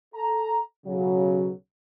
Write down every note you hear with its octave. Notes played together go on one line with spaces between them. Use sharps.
A4 A#5
B1 C#3 F#3